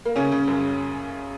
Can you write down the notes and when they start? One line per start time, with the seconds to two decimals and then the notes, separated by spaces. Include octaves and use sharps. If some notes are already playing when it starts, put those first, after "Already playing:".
0.05 A#3
0.16 C#3 C#4
0.32 C#3
0.48 F#2